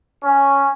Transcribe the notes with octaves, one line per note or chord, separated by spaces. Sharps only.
C#4